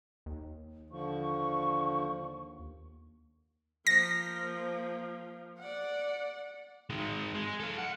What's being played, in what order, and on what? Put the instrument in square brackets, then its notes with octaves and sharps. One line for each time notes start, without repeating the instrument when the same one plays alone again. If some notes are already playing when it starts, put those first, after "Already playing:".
[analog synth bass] D#2
[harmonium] D3 F3 [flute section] C#6
[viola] F3 A#3 [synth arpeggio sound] A#6
[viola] D5 F#5
[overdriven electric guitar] D#3 G#3
G#3
A4 F5
F#5